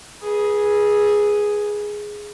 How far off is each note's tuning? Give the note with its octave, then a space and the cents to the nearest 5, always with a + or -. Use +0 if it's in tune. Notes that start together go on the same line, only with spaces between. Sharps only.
G#4 +0 B4 -30